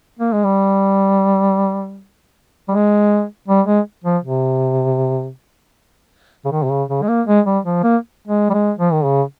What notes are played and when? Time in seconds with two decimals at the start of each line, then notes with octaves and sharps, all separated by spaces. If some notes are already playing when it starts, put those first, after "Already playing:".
0.19 A#3
0.32 G#3
0.45 G3
2.68 G3
2.72 G#3
3.48 G3
3.67 G#3
4.04 F3
4.24 C3
6.45 C#3
6.52 D#3
6.64 C3
6.70 C#3
6.89 C#3
7.03 G#3
7.09 A#3
7.27 G#3
7.46 G3
7.65 F3
7.84 A#3
8.28 G#3
8.50 G3
8.54 G#3
8.79 F3
8.92 D#3
9.05 C#3